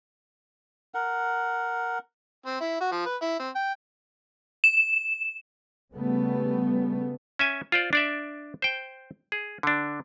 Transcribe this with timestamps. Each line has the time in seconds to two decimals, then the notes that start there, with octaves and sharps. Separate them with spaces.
0.94 A#4 F#5
2.46 C4
2.61 E4
2.81 F#4
2.92 F3
3.06 B4
3.22 E4
3.39 C4
3.55 G5
4.64 E7
5.92 C#3 G3 A3 B3
7.39 C#4 E5 G#5
7.72 F4 C5 D5
7.93 D4 D5 E5
8.62 C5 G5
9.32 G#4
9.63 D3 D4